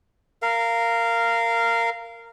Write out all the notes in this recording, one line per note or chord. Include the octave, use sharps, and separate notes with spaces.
A#4 F5